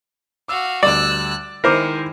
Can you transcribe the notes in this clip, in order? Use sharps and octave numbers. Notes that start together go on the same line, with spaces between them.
F#4 F5 D6 E6
D2 G3 D5 E6 F#6
D#3 G#3 E4 A#4 C5 D6